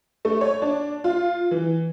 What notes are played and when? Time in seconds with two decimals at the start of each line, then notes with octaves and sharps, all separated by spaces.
0.25 A3
0.41 C#5
0.62 D4
1.04 F4
1.51 E3